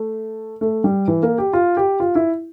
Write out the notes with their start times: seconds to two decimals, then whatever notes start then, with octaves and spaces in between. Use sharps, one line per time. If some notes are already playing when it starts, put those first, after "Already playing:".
Already playing: A3
0.61 A3
0.84 G3
1.08 E3
1.23 A#3
1.38 G4
1.53 F4
1.77 G4
2.00 F4
2.15 E4